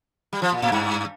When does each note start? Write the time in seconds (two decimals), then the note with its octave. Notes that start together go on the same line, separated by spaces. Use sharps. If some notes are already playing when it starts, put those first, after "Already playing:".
0.33 G3
0.42 F3
0.52 A#2
0.62 A2
0.72 G2